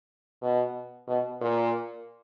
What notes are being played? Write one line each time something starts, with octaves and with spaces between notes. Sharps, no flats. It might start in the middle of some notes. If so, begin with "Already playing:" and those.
B2
B2
A#2